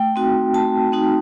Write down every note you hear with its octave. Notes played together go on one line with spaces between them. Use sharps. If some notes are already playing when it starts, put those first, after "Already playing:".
Already playing: A3 G5
C4 D#4 F#4
A3 A5
C4 D#4 F#4